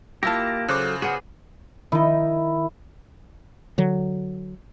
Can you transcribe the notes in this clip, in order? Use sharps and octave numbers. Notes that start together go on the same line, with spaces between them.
A#3 E4 F4 G4 F5 A5 A#6
C#3 F#3 A4 C5 D6 F#6
B3 F#4 G#4 F#5
D#3 D#4 E4
D3 F#3